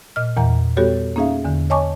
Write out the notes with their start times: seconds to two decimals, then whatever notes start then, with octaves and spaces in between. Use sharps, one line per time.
0.16 A#2 D#5 F6
0.37 E2 A#2 E3 F#5 A#5
0.77 G3 B3 F#4 G4 A4 C#5
1.16 A#3 C#4 D#4 G#4 E5 F5
1.45 E2 D3
1.70 C#5 D#5 G#5 A5 C#6 D6